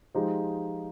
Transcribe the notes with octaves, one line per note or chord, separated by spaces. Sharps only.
F3 G#3 D#4 G4